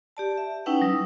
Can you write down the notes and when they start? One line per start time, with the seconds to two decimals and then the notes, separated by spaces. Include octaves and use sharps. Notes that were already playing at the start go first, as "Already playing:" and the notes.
0.17 G4 D5 A5
0.38 E5
0.66 C#4 D#4 E4 B4 F#5 G5
0.82 F#3 G3 D#6